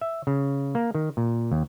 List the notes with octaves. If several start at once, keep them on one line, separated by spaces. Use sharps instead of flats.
E5
C#3
A#3
D#3
A#2
D#2